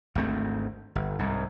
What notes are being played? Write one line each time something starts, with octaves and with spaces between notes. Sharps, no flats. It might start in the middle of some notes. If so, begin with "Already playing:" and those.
G#1 D2 A3 C4
G1
C2 G#2